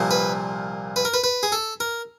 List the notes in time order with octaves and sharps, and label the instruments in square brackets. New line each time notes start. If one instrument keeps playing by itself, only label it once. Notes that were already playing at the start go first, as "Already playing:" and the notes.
Already playing: [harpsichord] C2 A#2 F3
B4
B4
A#4
B4
B4
G#4
A4
A#4